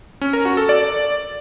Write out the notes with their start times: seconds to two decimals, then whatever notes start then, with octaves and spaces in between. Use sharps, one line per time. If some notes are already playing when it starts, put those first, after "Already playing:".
0.21 C#4
0.33 A#4
0.45 F#4
0.57 A4
0.69 D5